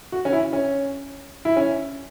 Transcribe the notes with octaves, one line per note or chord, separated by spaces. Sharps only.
F#4
C#4
E4
C#4
E4
C#4